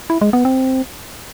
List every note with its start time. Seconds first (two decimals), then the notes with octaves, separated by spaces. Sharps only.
0.10 E4
0.21 G#3
0.33 B3
0.45 C4